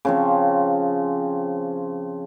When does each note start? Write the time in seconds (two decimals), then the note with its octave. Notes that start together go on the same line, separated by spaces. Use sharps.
0.05 C#3 F3 C4